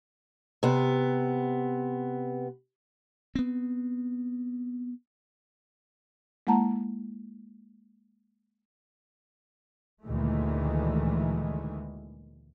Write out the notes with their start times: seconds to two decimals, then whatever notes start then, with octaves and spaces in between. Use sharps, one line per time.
0.63 C3 B3
3.35 B3 C4
6.47 G#3 A#3 E4 F#5 A5 A#5
10.04 D2 A#2 D#3 E3 G#3 A3